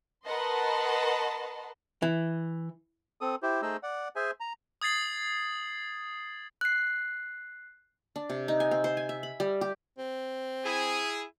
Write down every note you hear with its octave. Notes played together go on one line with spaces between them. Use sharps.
A#4 B4 D#5 F#5 A5 C6
E3
C4 A4 D#6
E4 G4 C5
A3 D#4 G#4 C5 D#5 E6
D5 F#5
G#4 C5 E5 G#5
A#5
D#6 G#6 A6 C7 F#7
F#6 C7
D4
C3
D#4
G#5
C4
C5
G#5
E5
B5
G3
G4
C4
E4 G#4